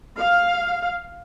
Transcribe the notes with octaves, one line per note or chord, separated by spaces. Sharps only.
F5